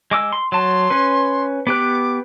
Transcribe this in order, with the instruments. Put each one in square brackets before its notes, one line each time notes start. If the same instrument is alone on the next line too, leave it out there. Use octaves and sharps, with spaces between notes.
[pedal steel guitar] G#3 D6 E6
C6
[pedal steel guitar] F#3 A5 [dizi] C6
[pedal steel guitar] C#4 B4
[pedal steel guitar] B3 G4 F#6 [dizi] D6